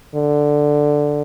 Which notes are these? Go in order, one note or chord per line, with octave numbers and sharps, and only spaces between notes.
D3